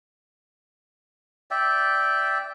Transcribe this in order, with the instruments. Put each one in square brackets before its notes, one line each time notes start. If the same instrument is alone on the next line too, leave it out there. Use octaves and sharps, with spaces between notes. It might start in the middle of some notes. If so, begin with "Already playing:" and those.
[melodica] D5 E5 G5